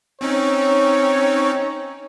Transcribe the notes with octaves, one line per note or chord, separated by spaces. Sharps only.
C4 C#4 D#4 C#5